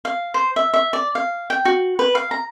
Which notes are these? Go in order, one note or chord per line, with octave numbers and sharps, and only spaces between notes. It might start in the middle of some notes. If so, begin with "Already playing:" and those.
F5
C5
E5
E5
D5
F5
G5
F#4
B4
F5
A#5